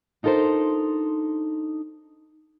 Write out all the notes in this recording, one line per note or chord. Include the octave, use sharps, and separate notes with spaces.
D4 D#4 F4 A4 A#4 C5